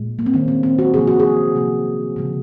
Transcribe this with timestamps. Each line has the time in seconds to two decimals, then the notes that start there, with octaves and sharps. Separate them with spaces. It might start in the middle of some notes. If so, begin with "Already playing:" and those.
Already playing: A#2 G#3
0.19 A#3
0.26 C4
0.34 D#3 G#3 C#4
0.48 C4
0.63 C4
0.79 F#4
0.94 C3 F3 A#3 G#4
1.07 F#4
1.19 G#4
1.56 C3 F3 A#3
2.16 C#3 F3 G#3